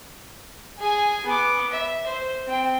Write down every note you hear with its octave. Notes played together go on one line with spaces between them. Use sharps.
G#4 G#5
B3 D6
E5
C5
C4 G5